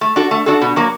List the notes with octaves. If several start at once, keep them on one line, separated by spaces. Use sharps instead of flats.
A3
D4 F#4 A4
A3
D4 F#4 A4
B2
F#3 A#3